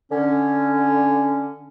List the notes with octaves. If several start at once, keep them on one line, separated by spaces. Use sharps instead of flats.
D3 C#4